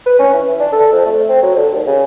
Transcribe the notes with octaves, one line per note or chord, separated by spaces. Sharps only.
B4
C#4
E3
D4
A4
F2
A3
C4
F#3
D3
D#2
C#3